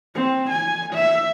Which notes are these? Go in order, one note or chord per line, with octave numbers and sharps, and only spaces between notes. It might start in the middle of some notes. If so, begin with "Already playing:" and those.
C4
G#5
E5